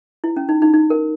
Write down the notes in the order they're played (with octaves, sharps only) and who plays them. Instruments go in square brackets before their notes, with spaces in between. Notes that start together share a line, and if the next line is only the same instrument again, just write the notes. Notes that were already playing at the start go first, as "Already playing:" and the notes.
[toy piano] E4
C#4
D#4
D#4
D#4
A#4